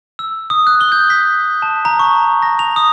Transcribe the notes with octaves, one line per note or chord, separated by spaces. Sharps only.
E6
D#6
F#6
G7
G6
B6
A5
A#5
C#6
A#6
F7
D#6